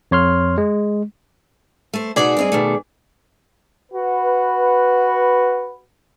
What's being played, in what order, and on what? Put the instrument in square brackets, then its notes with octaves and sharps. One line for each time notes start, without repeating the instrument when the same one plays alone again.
[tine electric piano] F2 C#5 C6 F6
G#3
[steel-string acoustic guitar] A3 C5
[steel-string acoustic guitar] B2 D#4 F#4 [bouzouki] G#4 D5
[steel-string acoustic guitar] G2 C4 D#5
B2 D#3 A3
[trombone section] F#4 B4